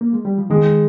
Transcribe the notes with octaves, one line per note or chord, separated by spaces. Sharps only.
A#3
G#3
G3
F3
D#3 G#3